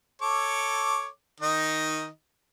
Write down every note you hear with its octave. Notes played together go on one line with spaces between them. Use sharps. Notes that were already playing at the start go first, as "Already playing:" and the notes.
A4 C#5 D6
D#3 D#4 D#5